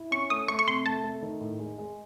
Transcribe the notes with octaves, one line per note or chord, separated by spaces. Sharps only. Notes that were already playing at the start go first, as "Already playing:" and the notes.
Already playing: E4
C#4 C#6
A3 D#6
A3 C#6
C#6
C3 C6
A3 A5
A3
D#3
A2
G#3
G#3